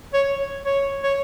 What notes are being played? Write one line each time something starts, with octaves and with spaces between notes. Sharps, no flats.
C#5
C#5
C#5